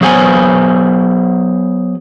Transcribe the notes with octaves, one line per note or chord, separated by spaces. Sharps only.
F#3 B3 G#4 C5 G#5